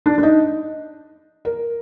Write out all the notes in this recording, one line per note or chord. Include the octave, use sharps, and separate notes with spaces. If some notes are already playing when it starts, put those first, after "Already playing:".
D4
D4
D#4
A#4